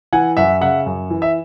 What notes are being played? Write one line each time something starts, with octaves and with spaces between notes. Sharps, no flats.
E3 F#5 G#5
F#2 E5 F#5
C#3 E5 F#5
F#2
E3
E5